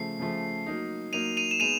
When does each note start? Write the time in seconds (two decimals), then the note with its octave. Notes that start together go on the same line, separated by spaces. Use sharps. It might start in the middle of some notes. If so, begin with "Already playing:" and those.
Already playing: C#3 F3 A3 C7
0.19 C#3 F3 A3
0.66 F#3 A#3 D#4
1.13 F#3 A#3 D#4 D#7 F7
1.37 D#7 F7
1.51 E7
1.60 G#3 B3 D#4 D#7 F7